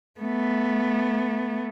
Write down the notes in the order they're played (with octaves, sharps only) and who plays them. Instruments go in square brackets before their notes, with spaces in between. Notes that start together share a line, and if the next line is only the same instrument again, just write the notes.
[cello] A3 B3